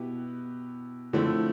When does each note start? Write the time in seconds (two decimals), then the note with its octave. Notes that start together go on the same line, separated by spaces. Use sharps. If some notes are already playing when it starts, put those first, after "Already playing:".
Already playing: B2 B3 E4 G4 B4
1.13 D3 F3 A3 C4 E4